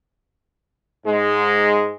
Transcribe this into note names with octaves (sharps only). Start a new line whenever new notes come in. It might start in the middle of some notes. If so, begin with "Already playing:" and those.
G#2 G#3